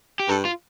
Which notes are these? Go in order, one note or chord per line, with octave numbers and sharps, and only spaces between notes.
G4
G2 A4
F4